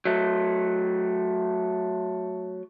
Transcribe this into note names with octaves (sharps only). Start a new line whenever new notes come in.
F#3 A3